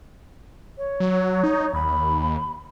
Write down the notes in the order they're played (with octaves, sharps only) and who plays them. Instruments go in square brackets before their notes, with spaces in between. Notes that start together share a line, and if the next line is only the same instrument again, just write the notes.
[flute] C#5
[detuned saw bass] F#3
D#4
[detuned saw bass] D#2 [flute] B5